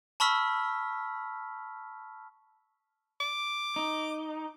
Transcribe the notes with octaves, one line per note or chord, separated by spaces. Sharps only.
A5 B5 C#6 E6 F6 B6
D6
D#4